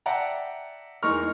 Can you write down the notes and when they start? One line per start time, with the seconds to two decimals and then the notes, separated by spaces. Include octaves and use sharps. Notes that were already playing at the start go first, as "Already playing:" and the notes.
0.06 D5 E5 F#5 G5 A5 A#5
1.03 E2 G#3 D#4 A#4 C#6 F6